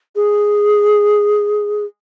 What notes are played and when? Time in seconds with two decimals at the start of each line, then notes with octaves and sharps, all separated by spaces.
0.16 G#4